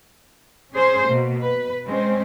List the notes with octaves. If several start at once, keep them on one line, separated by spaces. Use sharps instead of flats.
C#4 G#4 C5
B2 A#3
B4
G#3 C4 C#4 C5